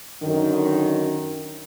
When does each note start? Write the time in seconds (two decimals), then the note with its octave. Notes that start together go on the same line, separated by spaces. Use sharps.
0.23 F#2 D3 D#3